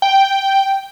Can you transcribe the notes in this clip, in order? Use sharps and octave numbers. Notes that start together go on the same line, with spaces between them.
G5